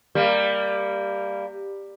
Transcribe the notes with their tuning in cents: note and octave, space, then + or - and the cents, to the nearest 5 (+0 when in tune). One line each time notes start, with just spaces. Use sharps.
G3 +10 A#3 -15